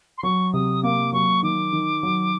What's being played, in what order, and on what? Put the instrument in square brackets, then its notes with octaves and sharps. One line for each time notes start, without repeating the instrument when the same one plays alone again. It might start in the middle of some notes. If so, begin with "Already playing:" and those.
[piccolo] C6
[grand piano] F#3 [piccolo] C#6
[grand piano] C3 [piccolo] D#6
[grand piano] A#3 [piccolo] D6
[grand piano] F#3 [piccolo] C#6
[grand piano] D#3 [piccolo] D6
[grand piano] D#3
F#3